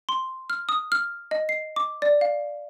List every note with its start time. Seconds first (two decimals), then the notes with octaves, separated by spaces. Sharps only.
0.09 C6
0.50 F6
0.69 D#6
0.92 F6
1.31 D#5
1.49 C7
1.76 D6
2.02 D5
2.21 F5